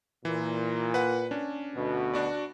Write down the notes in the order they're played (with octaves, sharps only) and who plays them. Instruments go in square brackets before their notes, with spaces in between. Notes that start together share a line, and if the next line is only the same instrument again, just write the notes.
[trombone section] A#2 [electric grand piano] E3
[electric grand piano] B4 F#5
C#4 D4
[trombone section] D2 B2
[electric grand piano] D4 F#4 D5